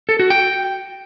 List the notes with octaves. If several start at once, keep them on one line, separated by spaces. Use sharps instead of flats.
A4
F#4
G5